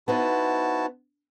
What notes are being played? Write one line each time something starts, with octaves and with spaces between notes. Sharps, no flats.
B3 D#4 E4 F#4 C5 A5